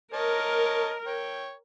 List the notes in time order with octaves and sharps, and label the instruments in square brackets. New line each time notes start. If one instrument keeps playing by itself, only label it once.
[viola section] A#4 [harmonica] C#5 D#5 A5
[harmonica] C#5 G5